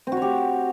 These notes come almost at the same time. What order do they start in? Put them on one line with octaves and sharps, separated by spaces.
C4 F#4 C#5 G4